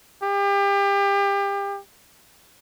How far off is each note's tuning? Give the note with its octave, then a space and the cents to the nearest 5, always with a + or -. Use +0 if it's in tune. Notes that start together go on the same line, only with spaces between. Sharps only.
G4 +30